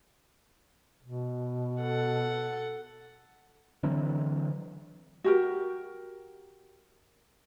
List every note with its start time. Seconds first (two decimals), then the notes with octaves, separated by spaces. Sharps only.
1.03 B2
1.82 A4 F#5
3.83 D3 E3 F#3 C4
5.24 F#4 G4 A#4